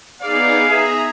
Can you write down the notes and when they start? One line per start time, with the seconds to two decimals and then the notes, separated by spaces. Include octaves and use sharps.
0.22 B3 D#4 G#4 D5 F5
0.69 G#4 E5 A#5